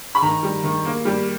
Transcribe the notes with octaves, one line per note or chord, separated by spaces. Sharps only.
B5
D#3 A#5
G3
D#3
A#3
G3